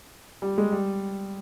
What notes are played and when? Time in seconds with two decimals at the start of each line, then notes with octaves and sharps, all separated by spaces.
0.42 G3
0.58 G#3
0.72 G3